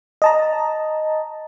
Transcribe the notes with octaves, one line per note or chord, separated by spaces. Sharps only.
D#5 A5 A#5